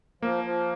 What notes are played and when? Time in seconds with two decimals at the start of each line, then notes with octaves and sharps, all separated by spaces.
0.22 F3 A#3
0.44 F3